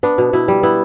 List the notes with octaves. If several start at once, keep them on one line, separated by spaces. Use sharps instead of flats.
B3 D4
B2
B2 E4
G3
B3 E4